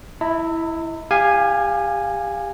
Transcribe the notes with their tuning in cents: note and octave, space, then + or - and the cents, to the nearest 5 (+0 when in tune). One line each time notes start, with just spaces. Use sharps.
E4 +0 D#5 +40 A#5 -40
G4 +30 F5 +0 G#5 -5